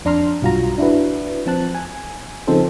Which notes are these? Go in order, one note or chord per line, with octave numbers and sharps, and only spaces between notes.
F2 D4 A#5 C6 F6
B1 G2 F4 F#4 A#5
D4 E4 F#4 B4
F3 C4 A5 F#6
G#5
C#3 F3 C4 D#4 A4 C5